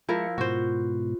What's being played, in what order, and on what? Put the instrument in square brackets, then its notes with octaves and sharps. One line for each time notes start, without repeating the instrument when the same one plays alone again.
[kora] F3 E4 A#4 [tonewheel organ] G#3 E5 C#6 [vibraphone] F5
[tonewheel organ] G#2 B2 [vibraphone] F4 [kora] F#4 C5